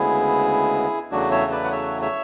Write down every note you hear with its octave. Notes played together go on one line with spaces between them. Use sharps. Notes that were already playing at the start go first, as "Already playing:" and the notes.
Already playing: D2 C#3 G#3 B3 E4 G#4
E2 C#3 F#3 A3 D4 F#4
C#5 E5
B4 D5
F#5
C#5 E5
C#5 E5